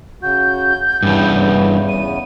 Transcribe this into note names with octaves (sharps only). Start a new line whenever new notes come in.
C#3 F#4 G6
E2 G2 C#3 E3 B3
D#7